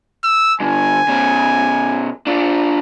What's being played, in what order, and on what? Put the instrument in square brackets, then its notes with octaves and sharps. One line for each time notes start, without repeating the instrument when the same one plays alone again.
[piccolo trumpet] E6
[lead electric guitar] G2 D3 [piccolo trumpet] G#5
[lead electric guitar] B2 C#4
D4 F4